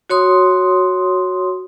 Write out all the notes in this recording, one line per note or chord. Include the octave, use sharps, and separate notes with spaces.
F#4 C#5 C6 D#6